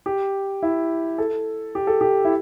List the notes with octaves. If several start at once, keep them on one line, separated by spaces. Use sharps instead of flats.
G4
E4
A4
G4
A4
G4
E4